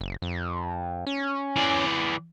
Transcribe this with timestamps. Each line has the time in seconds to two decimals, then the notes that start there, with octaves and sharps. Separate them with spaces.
0.01 F#1
0.22 F2
1.07 C#4
1.56 E3 D5